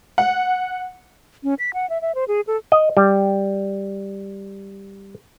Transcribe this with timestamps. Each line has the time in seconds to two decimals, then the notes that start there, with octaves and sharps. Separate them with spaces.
0.18 F#5
1.44 C#4
1.59 B6
1.74 F#5
1.90 E5
2.02 E5
2.15 C5
2.28 G#4
2.47 A4
2.72 D#5
2.97 G3